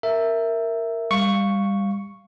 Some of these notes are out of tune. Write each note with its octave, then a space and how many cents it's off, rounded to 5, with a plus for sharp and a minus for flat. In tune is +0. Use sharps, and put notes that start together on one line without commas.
A#4 -10 E5 +0
G3 +25 F5 +0 C#6 +0